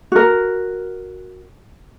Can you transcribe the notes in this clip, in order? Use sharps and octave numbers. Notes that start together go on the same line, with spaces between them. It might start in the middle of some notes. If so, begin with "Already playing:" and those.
F#4 A#4